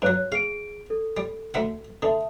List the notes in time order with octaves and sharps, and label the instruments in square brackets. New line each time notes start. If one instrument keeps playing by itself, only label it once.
[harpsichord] G2 F#3 [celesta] C#5 F#6
[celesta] G#4 D7 [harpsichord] F5
[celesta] A4
[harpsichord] G3
D2 E5 F#5
[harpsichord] D3 [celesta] E5 A5 D#6